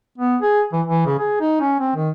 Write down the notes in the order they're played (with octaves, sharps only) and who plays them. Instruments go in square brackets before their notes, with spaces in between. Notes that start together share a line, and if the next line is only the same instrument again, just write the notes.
[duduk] B3
G#4
E3
E3
C#3
G#4
D#4
C#4
C4
D#3